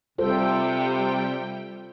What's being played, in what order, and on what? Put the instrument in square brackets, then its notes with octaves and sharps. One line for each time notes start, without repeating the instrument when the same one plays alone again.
[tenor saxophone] C3 [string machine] G3 G5 [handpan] F4 A4 C5